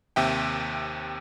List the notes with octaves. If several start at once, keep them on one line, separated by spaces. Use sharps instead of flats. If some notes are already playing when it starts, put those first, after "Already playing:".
D#2 C3 E5 G5